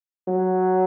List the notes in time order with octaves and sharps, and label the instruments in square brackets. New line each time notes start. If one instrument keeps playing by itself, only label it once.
[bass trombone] F#3